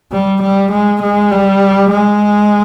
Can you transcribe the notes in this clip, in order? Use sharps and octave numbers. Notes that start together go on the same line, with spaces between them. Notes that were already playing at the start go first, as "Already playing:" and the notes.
G3
G3
G#3
G#3
G3
G#3